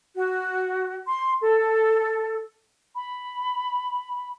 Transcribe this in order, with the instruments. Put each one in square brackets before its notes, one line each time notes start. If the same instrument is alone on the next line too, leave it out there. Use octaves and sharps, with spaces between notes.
[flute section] F#4
C6
A4
[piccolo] B5